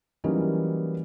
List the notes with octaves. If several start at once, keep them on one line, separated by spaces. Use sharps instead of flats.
E3 F#3 G3 A#3 C#4 D#4